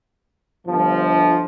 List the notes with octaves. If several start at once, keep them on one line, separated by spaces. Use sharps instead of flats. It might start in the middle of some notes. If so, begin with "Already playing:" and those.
G1 F3